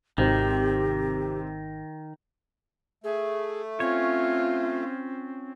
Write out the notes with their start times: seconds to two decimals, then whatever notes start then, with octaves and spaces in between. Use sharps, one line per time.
0.18 G#1 C3 D#3 G4 C5
3.04 A3 G#4
3.80 C4 C#4 F4 C#5